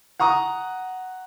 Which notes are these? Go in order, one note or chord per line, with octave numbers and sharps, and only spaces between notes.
F#5 A#5 C#6 D#6